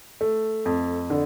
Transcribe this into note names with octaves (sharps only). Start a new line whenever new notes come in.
A3
F2
D3